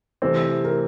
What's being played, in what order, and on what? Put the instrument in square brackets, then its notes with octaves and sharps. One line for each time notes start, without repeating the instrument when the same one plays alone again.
[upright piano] C3 E3 A3 C4 [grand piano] C5
[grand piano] A#4